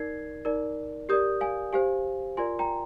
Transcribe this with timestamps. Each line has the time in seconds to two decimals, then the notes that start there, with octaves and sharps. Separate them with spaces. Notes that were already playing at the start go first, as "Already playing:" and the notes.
Already playing: D#4 A#4 D5 G#6 C7
0.45 D#4 A#4 D5
1.09 G4 A#4 D5 D#6 G6
1.41 F5 G#5
1.73 G4 C5 F5 G#5
2.37 F4 A#4 D5 G#5 C6
2.59 G5 A#5